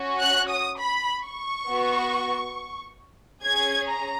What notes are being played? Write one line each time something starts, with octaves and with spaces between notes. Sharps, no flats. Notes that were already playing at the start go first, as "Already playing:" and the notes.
Already playing: C#4 F#4
F#6
D#6
B5
C#6
B3 F#4
C#4 G#4 G#6
A#5